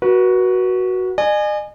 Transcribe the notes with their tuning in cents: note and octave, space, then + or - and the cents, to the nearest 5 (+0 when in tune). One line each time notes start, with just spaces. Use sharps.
F#4 +5 B4 -35
D#5 -45 G#5 +0